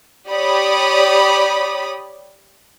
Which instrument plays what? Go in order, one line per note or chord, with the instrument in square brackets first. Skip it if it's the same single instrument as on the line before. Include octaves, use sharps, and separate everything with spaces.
[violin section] G4 C#5 D5 B5 D#6